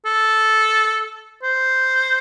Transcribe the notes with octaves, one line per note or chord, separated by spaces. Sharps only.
A4
C5